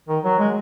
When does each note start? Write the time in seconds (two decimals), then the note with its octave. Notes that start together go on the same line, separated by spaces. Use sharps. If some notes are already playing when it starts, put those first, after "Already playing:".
0.09 D#3
0.24 F#3
0.39 G#3